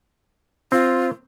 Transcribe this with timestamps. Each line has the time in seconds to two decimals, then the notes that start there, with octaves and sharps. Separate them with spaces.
0.72 C4 F4